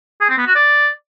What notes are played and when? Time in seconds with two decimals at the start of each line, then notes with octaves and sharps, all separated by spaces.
0.21 G#4
0.29 C4
0.38 B3
0.47 F#4
0.55 D5